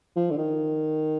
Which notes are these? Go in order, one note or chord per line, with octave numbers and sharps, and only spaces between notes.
F3
D3
D#3